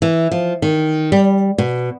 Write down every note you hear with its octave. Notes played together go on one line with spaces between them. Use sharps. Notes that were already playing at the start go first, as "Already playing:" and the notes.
E3
F3
D#3
G3
B2